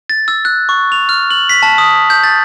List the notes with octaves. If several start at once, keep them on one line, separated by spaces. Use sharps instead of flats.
A6
E6
F#6
C#6
F7
F6
F#7
B6
A5
D#6
G6
A6